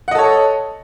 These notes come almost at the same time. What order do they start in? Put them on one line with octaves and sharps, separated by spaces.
F#5 D#5 A4 C#5